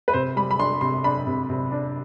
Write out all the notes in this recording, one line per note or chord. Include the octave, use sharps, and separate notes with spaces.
B4
C3 C5
G3 B5
B5
D4 C6
C3 C6
D4 B5
C3
C3
D4